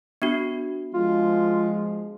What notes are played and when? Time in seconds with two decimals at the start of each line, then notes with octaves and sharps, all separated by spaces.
0.22 B3 D4 F#4
0.94 F3 G#3 F4